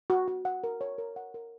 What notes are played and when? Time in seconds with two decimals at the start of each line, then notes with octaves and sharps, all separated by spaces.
0.10 F#4
0.28 F#4
0.45 F#5
0.64 A#4
0.81 C#5
0.98 A#4
1.16 F#5
1.34 A#4